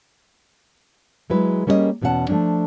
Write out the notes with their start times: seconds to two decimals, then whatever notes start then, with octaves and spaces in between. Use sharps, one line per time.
1.30 F#3 G#3 E4 B4
1.67 G3 A#3 C#4 G#4 C5 D#5
2.01 E2 B2 C#4 E4 F#5 A5
2.29 F3 A3 A#3 C#4 D4